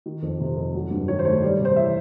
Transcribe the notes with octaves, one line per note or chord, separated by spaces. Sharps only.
D#3
F2
C3
F2
F#3
G2
D#3 C#5
C5
A3 C#5
G3 D5
C#5
C3
C5
E3 E5